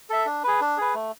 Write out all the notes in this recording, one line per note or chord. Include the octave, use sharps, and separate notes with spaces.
A4 E5
D4
G#4 B4
D4
G#4 B4
A3